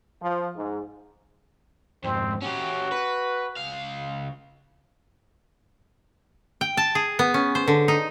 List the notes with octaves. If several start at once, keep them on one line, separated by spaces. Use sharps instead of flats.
F3
G#2
F2 G#2 C4
C#4 F#4 G4
B4
C#2 F5
G5
A5
G#4
B3
C#4
C5
D3
D#4